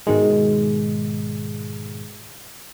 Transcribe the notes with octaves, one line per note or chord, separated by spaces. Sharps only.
G#2 B2 D#3 G#3